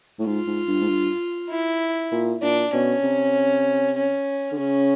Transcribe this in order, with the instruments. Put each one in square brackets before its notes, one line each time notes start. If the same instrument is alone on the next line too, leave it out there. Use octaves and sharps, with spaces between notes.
[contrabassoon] A2
[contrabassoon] G#2 [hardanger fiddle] F4
[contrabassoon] G#2
G2
G#2
G2
[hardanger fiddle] E4
[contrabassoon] A#2
[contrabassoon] A#2 [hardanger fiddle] D4
[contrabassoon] B2 [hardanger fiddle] C#4
[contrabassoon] C3
[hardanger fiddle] C#4
[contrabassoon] D3
[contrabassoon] C#3 [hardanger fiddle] C#4